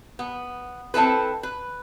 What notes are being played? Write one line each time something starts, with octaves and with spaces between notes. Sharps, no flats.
B3
C4 E4 A4 B4
B4